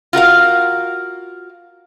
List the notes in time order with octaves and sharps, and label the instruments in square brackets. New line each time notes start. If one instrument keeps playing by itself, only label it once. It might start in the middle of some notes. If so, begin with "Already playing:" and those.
[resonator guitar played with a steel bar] F4 F#4 A#4 F5